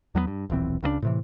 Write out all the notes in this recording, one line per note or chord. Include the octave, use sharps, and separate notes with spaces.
E2 F#3 G3 B3
G2
D#1 B1 E3 C4
C#2 C#3 G#3 D4
A2 C3 E3